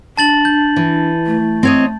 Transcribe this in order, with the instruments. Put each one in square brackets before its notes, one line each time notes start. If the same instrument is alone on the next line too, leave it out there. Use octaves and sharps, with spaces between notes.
[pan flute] D4 [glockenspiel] A5 A6 F#7
[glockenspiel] G6
[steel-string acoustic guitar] E3
[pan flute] A3
[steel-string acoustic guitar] C4 C#5 D#5